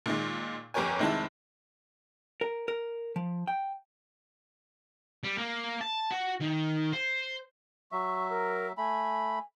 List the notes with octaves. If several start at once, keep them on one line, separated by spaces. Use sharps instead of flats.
A#2 D#3 G#3
G1 F2 G4 A#4 C#5 G#5
F1 D#3 G#3 C4 E4 A5
A#4
A#4
F3
G5
G3
A#3
A5
F#4
D#3
C5
F#3 E5 C#6
A#4
A3 G#5 B5